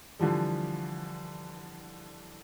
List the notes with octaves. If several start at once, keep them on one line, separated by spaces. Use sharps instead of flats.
D3 E3 F3 G3